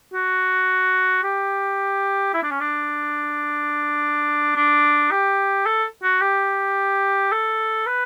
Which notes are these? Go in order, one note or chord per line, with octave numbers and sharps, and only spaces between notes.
F#4
G4
E4
D4
C#4
D4
D4
G4
A4
F#4
G4
A4
B4